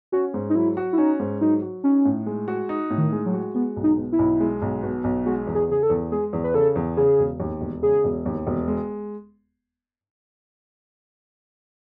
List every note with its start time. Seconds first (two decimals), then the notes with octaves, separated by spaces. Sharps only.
0.12 C#4 F#4
0.34 G#2
0.50 D#4
0.55 F#3 E4
0.77 F#4
0.93 E4
0.98 C#4 D#4
1.20 G#2
1.41 F#3 D#4
1.62 F#4
1.84 C#4 D#4
2.05 A2
2.26 G#3
2.48 F#4
2.69 D#4
2.90 A2
2.98 D#3
3.12 G#3
3.26 F#3
3.34 F#4
3.54 G#3 B3
3.76 B1
3.83 D#4
3.97 B2
4.12 E4
4.19 B1
4.40 G#3
4.62 B1
4.83 B2
5.04 B1
5.25 G#3 F#4
5.47 E2
5.55 G#4
5.69 C#3 G#4
5.83 A4
5.90 E2
6.12 G#3 G#4
6.33 E2
6.44 B4
6.54 C#3 A4
6.76 E2
6.97 C#3 G#4
7.19 E1
7.40 D#2
7.61 E1
7.83 C#3 G#4
8.04 E1
8.26 D#2
8.47 E1
8.68 G#3